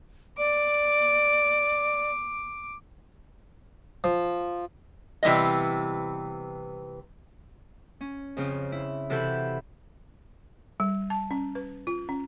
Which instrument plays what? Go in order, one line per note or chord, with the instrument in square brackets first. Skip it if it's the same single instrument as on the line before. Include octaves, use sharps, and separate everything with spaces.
[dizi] D5 [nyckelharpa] D6
[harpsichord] F3
[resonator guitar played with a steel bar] C3 E3 G3 B3 D#5
[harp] C#4
F2 C#3 C4 F4
E4
C3 E3 F#4 A4 B5 G6
[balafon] G3
A5
C#4
B4
F4
C#4